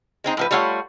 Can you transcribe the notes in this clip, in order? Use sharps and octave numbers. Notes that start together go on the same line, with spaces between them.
G#3 C4 D#4
A2 F3 B4
G3 A3 F4 C#5 F#5